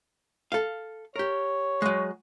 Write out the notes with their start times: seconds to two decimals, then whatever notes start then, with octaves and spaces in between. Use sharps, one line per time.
0.52 A4 F5
1.16 G4 A#4 C#5
1.82 F#3 G#3